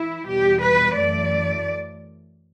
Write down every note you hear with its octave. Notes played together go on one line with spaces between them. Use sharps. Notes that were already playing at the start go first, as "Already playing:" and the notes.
Already playing: E3 E4
E2 B2 G3 G4
B4
F#2 E3 A3 D5